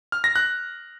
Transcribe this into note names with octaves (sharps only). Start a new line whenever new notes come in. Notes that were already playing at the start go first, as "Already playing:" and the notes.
F6
A#6
F#6